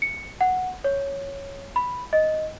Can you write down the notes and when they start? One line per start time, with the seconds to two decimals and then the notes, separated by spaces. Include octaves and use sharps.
0.02 C#7
0.41 F#5
0.84 C#5
1.76 B5
2.13 D#5